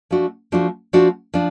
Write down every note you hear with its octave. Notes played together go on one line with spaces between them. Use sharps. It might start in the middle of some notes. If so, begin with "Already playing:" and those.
F3 A3 D4 F#4
F3 A3 D4 F#4
F3 A3 D4 F#4
F3 D4